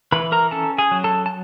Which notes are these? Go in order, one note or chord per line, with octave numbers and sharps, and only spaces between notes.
E3 B4 B5
A#4 A#5
C#4 A4 A5
G#4 G#5
F#3
A4 A5
A5